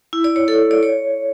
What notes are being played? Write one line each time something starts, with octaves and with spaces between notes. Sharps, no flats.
E4
D5
C#5
A4
D5
C#5